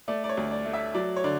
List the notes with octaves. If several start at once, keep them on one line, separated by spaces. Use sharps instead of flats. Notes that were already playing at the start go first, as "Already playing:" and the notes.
A3 D5
D5
C#5
D2
D5
A3
E5
F#3 D5
C#5
D3 D5